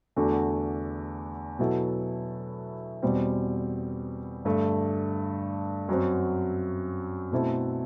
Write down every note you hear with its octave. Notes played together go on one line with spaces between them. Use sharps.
E2 D3 A3 D4 F#4
B2 F#3 B3 E4 A4
E2 B2 G3 C4
G2 D3 A3
F#2 F#3 C4
B2 A3 C4 E4 A4